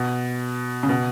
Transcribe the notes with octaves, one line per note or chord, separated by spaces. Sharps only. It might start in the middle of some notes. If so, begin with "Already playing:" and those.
Already playing: B2
C#3
B2